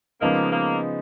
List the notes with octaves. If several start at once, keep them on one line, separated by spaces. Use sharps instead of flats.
C#3 F3 G#3 A#3 B3 D#4
A#3